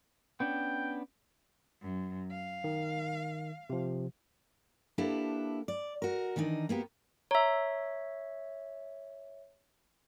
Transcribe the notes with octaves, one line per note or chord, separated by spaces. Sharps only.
B3 C#4 D4 G5
F#2
F5
D#3
C3 F3
A#3 D4 E4 G4 A4 B4
D5
F#4 A#4
D#3 E3 D4 D#4
A#3 B3 F#4 G4
C#5 E5 A#5 E6